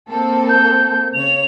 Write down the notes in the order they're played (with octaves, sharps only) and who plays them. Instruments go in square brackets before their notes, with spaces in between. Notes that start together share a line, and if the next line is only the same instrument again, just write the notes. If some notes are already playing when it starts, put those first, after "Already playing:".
[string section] A#3 C4 A4
[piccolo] G6
[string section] C#3 C#5 [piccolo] F7